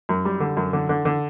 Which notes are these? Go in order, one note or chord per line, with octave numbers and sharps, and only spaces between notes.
F#2
G3
D3
F#2
D3
D3
D3